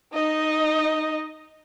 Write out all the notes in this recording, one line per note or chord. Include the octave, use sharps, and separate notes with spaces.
D#4 D#5